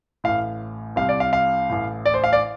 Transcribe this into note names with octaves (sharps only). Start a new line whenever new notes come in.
A1 A2 F5
C2 C3 F5
D5
F5
F5
A1 A2
D5
C5
F5
D5